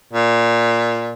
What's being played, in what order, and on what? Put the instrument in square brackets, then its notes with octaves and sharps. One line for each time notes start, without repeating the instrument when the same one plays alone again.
[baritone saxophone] A#2